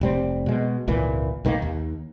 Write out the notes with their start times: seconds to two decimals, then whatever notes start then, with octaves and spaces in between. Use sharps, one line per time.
0.01 F1 G3 C4
0.46 B2 G#3
0.88 G#1 C#2 A#2 E3
1.45 B1 D#3 G3 A#3
1.62 D#2